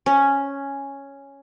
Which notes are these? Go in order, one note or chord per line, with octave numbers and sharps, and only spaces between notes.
C#4